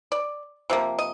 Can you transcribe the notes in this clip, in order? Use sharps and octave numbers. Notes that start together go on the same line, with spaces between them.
D5
C3 F3 A#3
D#5